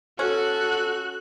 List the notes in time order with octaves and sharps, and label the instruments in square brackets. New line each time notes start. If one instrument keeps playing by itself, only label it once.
[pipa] C#4 [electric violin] F#4 [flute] A4 [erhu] F#6